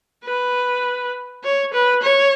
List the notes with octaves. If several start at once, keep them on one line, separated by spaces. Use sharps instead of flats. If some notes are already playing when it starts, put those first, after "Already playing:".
B4
C#5
B4
C#5